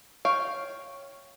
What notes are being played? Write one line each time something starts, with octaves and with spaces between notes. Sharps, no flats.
C#5 F5 G5